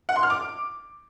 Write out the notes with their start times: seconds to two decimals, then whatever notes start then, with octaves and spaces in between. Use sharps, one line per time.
0.09 F#5
0.16 C6
0.23 F6
0.30 D6